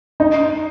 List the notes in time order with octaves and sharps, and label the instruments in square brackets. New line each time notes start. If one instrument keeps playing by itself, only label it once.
[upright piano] D#4